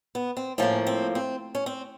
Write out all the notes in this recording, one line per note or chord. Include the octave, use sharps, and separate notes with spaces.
B3
C4
A2 F3 A#3 C#4
C4
C4
C#4
C4